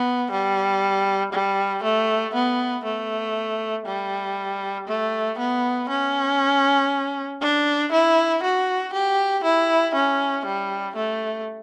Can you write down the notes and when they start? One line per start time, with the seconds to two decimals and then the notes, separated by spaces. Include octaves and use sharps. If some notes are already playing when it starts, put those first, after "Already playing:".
Already playing: B3
0.31 G3
1.33 G3
1.83 A3
2.34 B3
2.84 A3
3.86 G3
4.87 A3
5.38 B3
5.89 C#4
7.41 D4
7.92 E4
8.43 F#4
8.93 G4
9.44 E4
9.95 C#4
10.45 G3
10.96 A3